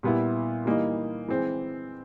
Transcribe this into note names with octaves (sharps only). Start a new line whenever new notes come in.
A#2 G3 B3 E4
E3 G3 A#3 D#4
E3 G#3 C4